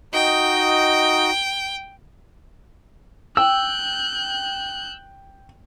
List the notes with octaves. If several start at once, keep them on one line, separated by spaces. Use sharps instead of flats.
D#4 F#4 D#5 G5
G5 E6 F#6 G6